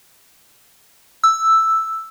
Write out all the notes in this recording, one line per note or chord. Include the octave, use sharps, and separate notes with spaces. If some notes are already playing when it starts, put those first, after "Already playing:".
E6